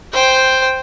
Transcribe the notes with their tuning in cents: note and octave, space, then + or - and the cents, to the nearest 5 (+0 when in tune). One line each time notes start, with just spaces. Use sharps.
C5 +0 G5 +5